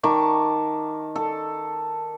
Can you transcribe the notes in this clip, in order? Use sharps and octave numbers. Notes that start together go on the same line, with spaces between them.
D#3 A5 C#6 D6
A4